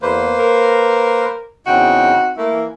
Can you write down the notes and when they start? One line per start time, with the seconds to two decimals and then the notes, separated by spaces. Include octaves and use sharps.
0.02 E2 A#3 B4 C5
0.39 A#4
1.67 E2 C#3 C4 D#4 F#4 G5
2.37 A3 A#3 E4
2.51 E3